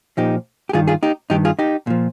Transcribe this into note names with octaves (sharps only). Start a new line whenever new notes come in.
A#2 F3 D#4 G4
G4
G2 D#3 F4 G#4
F4 G#4
D#4 G4
G2 D#3 D#4 G4
F4 G#4
D#4 G4
A#2 F3